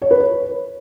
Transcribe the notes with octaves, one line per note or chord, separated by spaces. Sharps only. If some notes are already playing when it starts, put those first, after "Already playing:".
C#5
B4
C#5